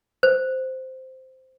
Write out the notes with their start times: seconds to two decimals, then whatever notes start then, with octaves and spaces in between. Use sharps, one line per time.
0.23 C5